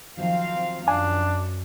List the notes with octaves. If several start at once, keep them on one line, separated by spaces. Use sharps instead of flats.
D#3 F3 F#3 C4 F5
F#2 D4 G#5